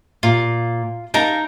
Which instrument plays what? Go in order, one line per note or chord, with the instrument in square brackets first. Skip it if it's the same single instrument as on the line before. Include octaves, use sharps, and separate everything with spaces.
[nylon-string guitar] A#2 [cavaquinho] F4
[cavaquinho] D#4 A#4 A#5 [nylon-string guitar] F5 A5